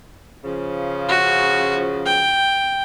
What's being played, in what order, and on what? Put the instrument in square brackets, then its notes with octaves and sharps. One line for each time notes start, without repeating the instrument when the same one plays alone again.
[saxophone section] C#3 F3
[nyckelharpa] F#4
G5